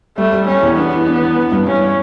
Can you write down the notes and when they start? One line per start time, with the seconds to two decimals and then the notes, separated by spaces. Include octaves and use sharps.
0.18 G3 A3
0.32 G3
0.47 G3 C#4
0.63 E2
0.77 B3 D4
0.93 E3
1.07 D4
1.22 E3
1.37 E3
1.52 G2
1.67 G2 C#4